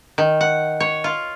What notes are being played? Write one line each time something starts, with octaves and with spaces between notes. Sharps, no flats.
D#3
F#5
C#5
F4